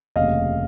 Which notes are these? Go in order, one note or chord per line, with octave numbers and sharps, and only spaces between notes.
F1 D#2 C#3 D#5 F5